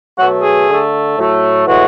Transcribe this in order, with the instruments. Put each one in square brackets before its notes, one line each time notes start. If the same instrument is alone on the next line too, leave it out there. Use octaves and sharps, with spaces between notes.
[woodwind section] B2 F#3 A3 F#4
G#4
D3 A3
A2 F#3 A3
A2 E3 G#3 F#4